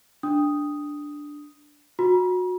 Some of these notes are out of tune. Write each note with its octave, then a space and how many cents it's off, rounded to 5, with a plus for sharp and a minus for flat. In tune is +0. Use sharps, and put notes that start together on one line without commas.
D4 +0 D#6 +0
F#4 -25 A#5 +45